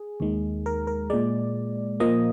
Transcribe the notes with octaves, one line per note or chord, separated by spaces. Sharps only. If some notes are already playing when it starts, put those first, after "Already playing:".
Already playing: G#4
D#2 D#3 G#3
A#4
A#4
A#2 G#3 D5
A#2 F3 A#3 D#5